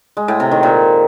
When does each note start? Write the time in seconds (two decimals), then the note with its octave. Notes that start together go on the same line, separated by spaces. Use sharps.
0.17 G#3
0.28 A2
0.40 C3
0.51 D#3
0.63 A#2